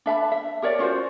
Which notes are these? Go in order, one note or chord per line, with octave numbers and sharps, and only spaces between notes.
D4 E5 A5 B5
E5
G4 A#4 C#5 D5
C#4 F4 F#4 C5